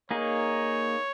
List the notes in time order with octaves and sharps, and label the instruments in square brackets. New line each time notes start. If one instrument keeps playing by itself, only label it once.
[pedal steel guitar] A#3 D#4 G#4 [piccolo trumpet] C#5